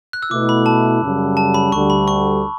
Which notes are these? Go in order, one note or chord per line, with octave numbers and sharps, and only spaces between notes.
F#6
E6
B2 A3 E4 D6
B5
A5
F#2 C#3 G3 C#4
A5
B5
D2 D3 G3 C#6
B5
C#6